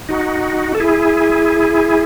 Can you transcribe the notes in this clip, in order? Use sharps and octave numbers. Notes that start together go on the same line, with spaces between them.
D#4 F#4
A4
E4 G#4